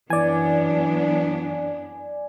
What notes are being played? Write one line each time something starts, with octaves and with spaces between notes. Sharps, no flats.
F#2 E3 B3 D4 D5 G#5